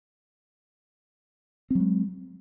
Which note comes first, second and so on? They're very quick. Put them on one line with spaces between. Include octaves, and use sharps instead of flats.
C4 F#3 G#3